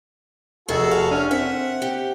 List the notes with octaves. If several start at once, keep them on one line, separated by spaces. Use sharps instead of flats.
F1 F#4 G#4 A4 D#5
F5
C#4 D4 F6
C4 E5 F#5
G4